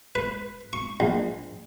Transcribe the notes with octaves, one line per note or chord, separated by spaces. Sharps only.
B4
C#6
A#1